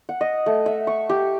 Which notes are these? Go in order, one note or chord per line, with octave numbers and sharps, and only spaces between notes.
F#5
D#5
A3
E5
C#6
G4